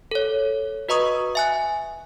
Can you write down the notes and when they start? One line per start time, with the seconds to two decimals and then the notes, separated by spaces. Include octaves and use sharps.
0.11 A4 C#5
0.89 F#4 B4 D#5 A#5 C#6 D#6
1.35 E5 G#5 F#6